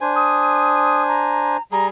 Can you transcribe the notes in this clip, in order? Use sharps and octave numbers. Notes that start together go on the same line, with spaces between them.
D4 C5 G#5
D#6
A#5
G3 G#4 A#5